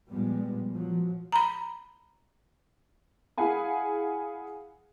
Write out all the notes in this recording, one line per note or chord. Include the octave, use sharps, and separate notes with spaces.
A#2 F3 G3 G#3 B3
F3 F#3
A#5 B5
E4 G#4 F5 F#5 G#5 B5